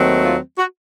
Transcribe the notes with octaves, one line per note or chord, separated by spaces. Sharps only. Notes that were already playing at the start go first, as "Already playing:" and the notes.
Already playing: D#2 D#3 F#3 A3 C4
F4
F#4